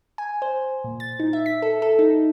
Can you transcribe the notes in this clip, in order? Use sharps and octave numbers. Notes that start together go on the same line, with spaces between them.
G#5
C5
A#2
A6
D#4
E5
B6
A4
A4
D#4